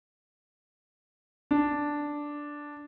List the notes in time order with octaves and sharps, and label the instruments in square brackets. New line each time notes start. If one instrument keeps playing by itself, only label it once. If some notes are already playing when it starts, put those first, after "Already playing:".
[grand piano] D4